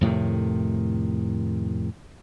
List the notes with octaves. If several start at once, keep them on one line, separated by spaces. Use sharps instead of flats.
F2 A2 C3 D#3